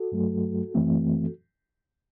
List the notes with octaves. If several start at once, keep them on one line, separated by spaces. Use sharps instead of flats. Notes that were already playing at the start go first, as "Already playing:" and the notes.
Already playing: F#4 A4
G2 F#3 A3
F#2 E3 A3 C4